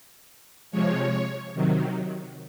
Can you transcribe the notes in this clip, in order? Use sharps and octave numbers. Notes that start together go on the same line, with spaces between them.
C3 F3 G#3 C#5
C3 D#3 F#3